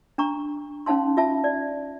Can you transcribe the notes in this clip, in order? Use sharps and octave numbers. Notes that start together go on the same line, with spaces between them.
D4 A#5 C#6
C#4 D#4 F5 A5 C6
F4 E5 A5
D5